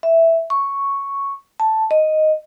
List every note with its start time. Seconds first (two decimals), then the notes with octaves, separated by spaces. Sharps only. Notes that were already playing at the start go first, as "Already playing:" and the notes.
0.03 E5
0.50 C#6
1.60 A5
1.91 D#5